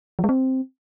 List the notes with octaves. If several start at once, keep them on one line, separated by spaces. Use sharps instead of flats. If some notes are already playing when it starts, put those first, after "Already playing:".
F3
G#3
C4